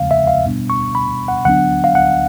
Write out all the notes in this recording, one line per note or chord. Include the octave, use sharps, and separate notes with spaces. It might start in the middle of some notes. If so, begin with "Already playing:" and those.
Already playing: E2 C#3 F3 G#3 C4 F5
E5
F5
B2 G3 B3 D4
C#6
B5
F#5
D3 F#3 B3 D4 F#5
F5
F#5